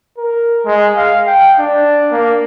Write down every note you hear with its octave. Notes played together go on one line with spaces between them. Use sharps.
A#4
G#3
F5
G5
D4
A#3